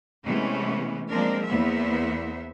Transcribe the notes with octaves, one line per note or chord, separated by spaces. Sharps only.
C3 E3 G#3 A3 B3 C#4
F3 G#3 A#3 C4 D4 A#4
E2 A#3 B3 C5 E5